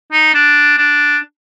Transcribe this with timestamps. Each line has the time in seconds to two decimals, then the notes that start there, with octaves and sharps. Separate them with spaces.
0.12 D#4
0.34 D4
0.78 D4